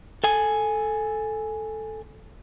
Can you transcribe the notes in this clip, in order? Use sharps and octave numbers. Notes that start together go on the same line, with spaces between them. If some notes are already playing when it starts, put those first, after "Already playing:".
A4 G#5